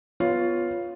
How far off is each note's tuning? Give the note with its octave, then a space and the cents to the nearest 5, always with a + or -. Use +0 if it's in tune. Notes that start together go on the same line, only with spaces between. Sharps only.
B3 +0 F4 +0 C#5 +10